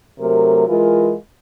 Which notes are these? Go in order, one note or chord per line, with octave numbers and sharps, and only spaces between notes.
C3 F#3 A3 A#4
E3 G#3 F4 A#4